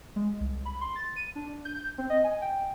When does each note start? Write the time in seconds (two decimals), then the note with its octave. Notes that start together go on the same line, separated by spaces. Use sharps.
0.16 G#3
0.40 C2
0.65 B5
0.81 C6
0.96 A6
1.16 D#7
1.36 D4
1.65 G6
1.98 C4
2.10 D#5
2.24 G#5
2.42 G5